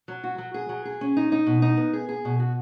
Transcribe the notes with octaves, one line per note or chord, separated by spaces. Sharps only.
F#3
F#4
F#3
G#4
F#3
G#4
C#4
D#4
D#4
B2
D#4
B3
G#4
G#4
B2
F#4